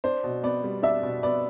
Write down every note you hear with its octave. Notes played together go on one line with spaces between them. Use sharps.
D4 C5
B2
B3 D5
G3
D4 E5
B2
B3 D5